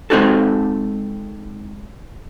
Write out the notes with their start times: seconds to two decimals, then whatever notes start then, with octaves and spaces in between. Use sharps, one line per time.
0.10 G#3 C4 D#4 F#4 A4